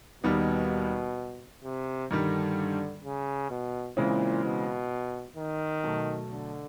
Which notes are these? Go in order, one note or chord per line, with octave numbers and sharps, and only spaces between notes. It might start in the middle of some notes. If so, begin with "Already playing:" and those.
D#2 B2 D#3 G3 B3 D#4
C3
G2 D3 D#3 G3
C#3
B2
A#2 C#3 E3 G#3 C4 E4
B2
D#3
B2 F#3 A3
D3